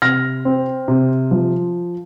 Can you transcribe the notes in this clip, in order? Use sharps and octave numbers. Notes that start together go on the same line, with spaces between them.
C3 F6 A#6
C4
C3
F3